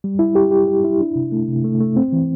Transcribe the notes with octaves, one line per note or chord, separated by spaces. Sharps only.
G3
E4
G4
G4
G4
E4
D4
C3
A3
C3
A3
A3
C4
E3